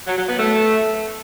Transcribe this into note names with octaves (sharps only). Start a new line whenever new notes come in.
F#3
F#3
B3
A3